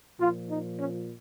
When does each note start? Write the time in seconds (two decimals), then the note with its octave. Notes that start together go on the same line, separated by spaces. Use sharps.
0.19 A#2 F3 F4
0.48 D#4
0.78 C#4